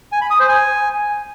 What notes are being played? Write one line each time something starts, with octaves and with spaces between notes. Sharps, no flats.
G#5
B5
D#6
C5
G#5